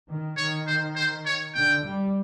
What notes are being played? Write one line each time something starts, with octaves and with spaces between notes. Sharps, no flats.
D#3
D#3 C#5
C5
C5
C#5
D3 G5
G3